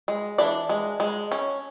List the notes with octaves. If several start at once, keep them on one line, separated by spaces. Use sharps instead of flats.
G#3
E3 D4 D5
G#3
G#3
C#4